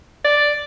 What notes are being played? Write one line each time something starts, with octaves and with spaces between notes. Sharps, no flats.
D5